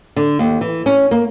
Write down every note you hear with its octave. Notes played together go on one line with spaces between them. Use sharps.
D3
D#2
E3
C#4
A#3